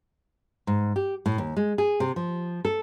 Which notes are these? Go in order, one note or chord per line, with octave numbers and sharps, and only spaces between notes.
G#2
G4
A2
D#2
G#3
G#4
C3
F3
A4